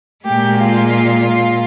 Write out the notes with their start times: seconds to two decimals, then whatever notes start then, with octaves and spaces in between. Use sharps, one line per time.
0.24 A#2 G#3 G4
0.58 F4